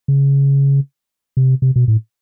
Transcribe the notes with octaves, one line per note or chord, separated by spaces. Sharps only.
C#3
C3
C3
B2
A2